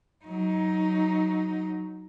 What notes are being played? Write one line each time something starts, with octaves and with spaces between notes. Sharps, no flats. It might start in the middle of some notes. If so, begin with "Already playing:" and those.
F#3 D#4